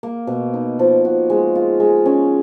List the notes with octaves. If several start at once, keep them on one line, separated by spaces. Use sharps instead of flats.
A#3
B2
D#4
F3
F#4
G#3
F4
G#3
C#4